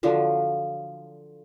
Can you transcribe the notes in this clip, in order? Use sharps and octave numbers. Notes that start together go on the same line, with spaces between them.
D3 F3 F#3